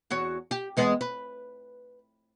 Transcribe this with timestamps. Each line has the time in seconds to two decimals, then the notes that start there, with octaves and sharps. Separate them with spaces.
0.10 E2 F#4 C#5
0.51 G4
0.77 E2 G#3 B3
1.01 B4